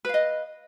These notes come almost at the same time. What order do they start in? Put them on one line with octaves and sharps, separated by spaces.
B4 F5 D#5